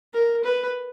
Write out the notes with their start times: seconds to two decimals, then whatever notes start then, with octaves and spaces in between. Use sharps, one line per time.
0.14 A#4
0.45 B4